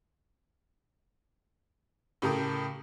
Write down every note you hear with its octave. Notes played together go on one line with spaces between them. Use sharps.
A2 C#3 G4 A4 A#4 D#6